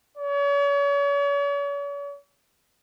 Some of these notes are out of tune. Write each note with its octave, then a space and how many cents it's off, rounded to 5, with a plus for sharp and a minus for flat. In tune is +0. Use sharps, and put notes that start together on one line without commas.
C#5 +40